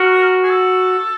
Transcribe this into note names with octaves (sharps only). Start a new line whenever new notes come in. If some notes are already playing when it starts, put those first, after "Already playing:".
Already playing: F#4 A#4
G#4
A4